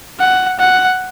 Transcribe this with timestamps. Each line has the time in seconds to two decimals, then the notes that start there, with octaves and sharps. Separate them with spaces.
0.20 F#5
0.59 F#5